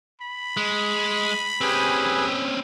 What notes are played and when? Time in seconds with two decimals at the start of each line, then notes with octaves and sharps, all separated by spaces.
0.21 B5
0.57 G#3
1.61 C4 C#4 G4 G#4 B4